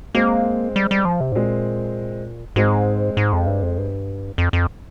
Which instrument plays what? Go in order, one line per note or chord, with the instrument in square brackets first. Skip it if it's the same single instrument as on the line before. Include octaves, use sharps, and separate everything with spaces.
[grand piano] G#3 C4 [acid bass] A#3
[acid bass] G3
G3
F3
C3
G#2
[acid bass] A#2 [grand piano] G#3 C4
[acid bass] G#2 [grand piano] G#3 C4
[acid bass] G#2
F2
G2
F2
G2
F2
F2